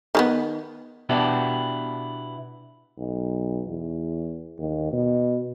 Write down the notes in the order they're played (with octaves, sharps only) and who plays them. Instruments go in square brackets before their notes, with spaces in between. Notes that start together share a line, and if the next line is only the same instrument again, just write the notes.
[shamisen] D#3 G#3 B3
[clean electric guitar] B2 B3 D4 E4 F#4 G4
[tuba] B1
E2
D#2
B2